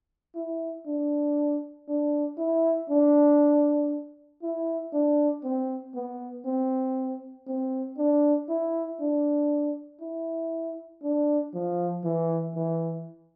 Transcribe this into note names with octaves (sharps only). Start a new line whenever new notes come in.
E4
D4
D4
E4
D4
E4
D4
C4
B3
C4
C4
D4
E4
D4
E4
D4
F3
E3
E3